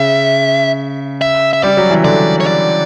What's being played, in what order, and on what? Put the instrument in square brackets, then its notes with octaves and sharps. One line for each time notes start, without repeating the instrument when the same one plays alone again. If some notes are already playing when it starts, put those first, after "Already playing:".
Already playing: [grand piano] C#3 [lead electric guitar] E5
[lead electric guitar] E5
E5
[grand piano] G3 [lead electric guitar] D5
[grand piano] F#3
E3
[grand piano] D3 [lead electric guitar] D5
[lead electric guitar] C#5
D5